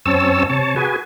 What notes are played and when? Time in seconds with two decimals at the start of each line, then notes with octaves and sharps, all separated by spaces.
0.06 F#2 C4 C#4 C#5 A5 E6
0.50 C3 C#5 A5
0.76 F#4 G#4 B4 G#5